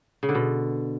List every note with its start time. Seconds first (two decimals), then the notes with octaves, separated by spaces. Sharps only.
0.23 C#3
0.29 D3
0.35 B2